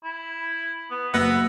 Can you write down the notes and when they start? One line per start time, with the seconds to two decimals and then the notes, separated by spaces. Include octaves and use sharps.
0.04 E4
0.91 B3
1.14 F#1 B3 E5 A#6